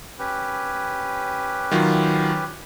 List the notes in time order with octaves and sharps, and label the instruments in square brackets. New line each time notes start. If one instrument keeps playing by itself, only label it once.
[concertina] C#4 G4 B4
[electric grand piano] D#3 F#3 F4